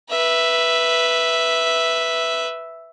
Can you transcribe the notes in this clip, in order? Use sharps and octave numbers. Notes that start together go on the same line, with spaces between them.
B4 E5